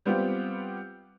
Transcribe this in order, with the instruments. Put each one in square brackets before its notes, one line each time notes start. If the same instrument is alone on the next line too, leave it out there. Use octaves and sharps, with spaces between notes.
[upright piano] G3 B3 C4 F4 G4